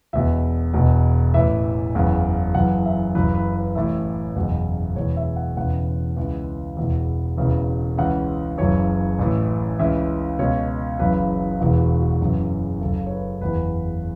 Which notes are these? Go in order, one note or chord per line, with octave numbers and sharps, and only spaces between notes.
E1 E2 B2 E5
E1 E2 B2
A1 A2 E3 E5
F#1 E2 C#3 E3
F#1 F#2 E3 F#5
E5
F#1 F#2 E3 B4
B4
B4
A1 A2 E3 E5
F#1 E2 B2
E1 E2 E3 C#5
E5
F#5
E1 E2 C#3 E3 F#5
C#2 C#3 E3
E1 E2 E3
E1 E2 C#3 E3
C#2 C#3 E3 F#5
F#1 F#2 E3 C#5
A1 A2 E3
C#2 C#3 E3 E5
C#2 B2 C#5
F#1 F#2 C#3 E3 B4
E1 E2 E3 B4
F#4
F#4
F#1 F#2 C#3 E3
F#1 F#2 C#3 A4
C#5
B4
F#1 E2 E3 B4